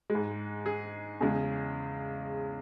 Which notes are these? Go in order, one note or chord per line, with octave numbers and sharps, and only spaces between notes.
G#3
G#2
G#4
E2 C#3 G#3